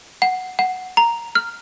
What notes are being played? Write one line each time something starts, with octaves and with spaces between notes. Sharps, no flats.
F#5
F#5
A#5
F6